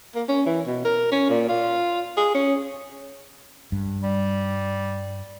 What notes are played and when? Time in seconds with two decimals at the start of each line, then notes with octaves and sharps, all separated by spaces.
0.15 A#3
0.29 C#4
0.46 E3
0.66 B2
0.85 A#4
1.11 C#4
1.29 A#2
1.49 F4
2.17 G#4
2.35 C#4
3.72 G2
4.03 G3